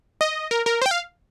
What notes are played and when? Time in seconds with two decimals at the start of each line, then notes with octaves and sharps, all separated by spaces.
0.21 D#5
0.51 A#4
0.66 A#4
0.82 C5
0.86 G5
0.91 F5